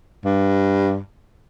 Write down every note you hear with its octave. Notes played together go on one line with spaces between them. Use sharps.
G2